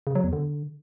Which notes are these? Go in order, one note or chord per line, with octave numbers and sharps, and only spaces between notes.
C#3
F#3
E2
D3